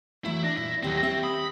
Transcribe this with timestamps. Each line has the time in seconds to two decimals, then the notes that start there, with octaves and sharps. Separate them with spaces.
0.25 E3 F#3 A3 E4
0.44 D4 A#6
0.57 A#2 E4
0.83 D#2 F#3 C4 G4
1.03 C4 G4 C#5 E5
1.23 B5 D#6